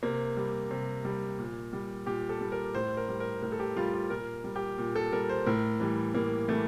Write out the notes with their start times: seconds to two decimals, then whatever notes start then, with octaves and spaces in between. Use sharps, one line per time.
0.03 C3 A#3
0.37 G3
0.71 C3
1.05 G3
1.39 A#2
1.73 G3
2.06 A#2 G4
2.29 A4
2.41 G3
2.52 A#4
2.75 A2 C5
2.97 A#4
3.09 G3
3.20 A#4
3.42 A2 A#4
3.52 A4
3.59 G4
3.76 G3 F4
3.93 F4
4.10 A#2 A#4
4.44 G3
4.56 G4
4.78 A#2
4.96 A4
5.12 G3 A#4
5.29 C5
5.46 A2 A#4
5.80 E3 G3
6.14 A2 A#3
6.48 E3 G3 A3